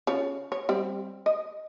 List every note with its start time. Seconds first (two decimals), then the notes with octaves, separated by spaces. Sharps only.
0.07 C#3 F4 C#5
0.52 C#5
0.69 G3 C4
1.26 D#5